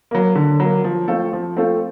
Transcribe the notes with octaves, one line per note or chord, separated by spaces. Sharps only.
F#3 A#3
D3
F#3 A#3
F3
A3 C4 F4 A4
F3
A3 C4 F4 A4